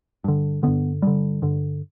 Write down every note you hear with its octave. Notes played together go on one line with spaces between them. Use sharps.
G2 D3
G2 D3 B3
G2 D3 G3
G2 D3